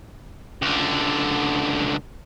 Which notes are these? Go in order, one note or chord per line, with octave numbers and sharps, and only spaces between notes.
C#2 D3